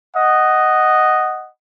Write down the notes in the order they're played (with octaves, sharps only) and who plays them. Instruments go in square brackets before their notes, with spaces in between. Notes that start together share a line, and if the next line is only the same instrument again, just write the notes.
[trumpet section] D#5 F#5